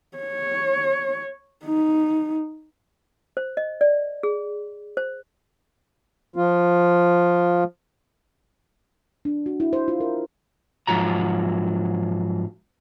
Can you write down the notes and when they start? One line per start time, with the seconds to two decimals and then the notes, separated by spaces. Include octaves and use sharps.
0.17 C#5
1.65 D#4
3.37 C5
3.57 D#5
3.81 D5
4.23 G#4
4.97 C5
6.36 F3 F4
9.25 D4
9.46 F#4
9.60 E4
9.73 C5
9.88 F4
10.00 A#4
10.87 G#2 F3 F#3 A#5